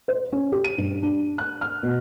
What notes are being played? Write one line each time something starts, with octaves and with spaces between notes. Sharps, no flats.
C5
C#4
G4
D#7
G2
D4
F#6
F6
B2